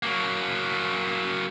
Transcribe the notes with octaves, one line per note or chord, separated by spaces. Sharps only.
F#3 A#3